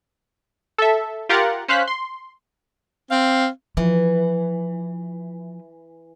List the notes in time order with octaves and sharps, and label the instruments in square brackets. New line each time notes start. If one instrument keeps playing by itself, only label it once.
[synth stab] A4 E5
F4 G4 A#4 F#5 A6
C#4 C5 F5 F#6 B6
C6
[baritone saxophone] C4 [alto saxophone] F5
[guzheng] E3 [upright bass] F3